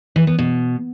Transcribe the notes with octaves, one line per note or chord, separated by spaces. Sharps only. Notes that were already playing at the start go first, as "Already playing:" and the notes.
E3
B3
B2